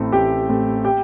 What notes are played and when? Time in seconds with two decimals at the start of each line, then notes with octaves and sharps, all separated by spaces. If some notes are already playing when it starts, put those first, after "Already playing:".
Already playing: A1 A2 A3 C4 A4
0.12 A1 G4 G5
0.49 A2 A3 C4
0.85 G4 G5